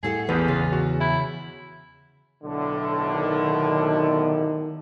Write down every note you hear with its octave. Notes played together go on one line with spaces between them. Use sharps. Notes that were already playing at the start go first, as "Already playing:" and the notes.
A2 G#4 A4 F#5
A1 E2 F3 B3 B4
C#3 F4
F#4
E4 E5
B1 A2 D3
D#3